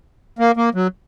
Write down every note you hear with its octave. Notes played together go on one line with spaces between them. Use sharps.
A#3
A#3
F#3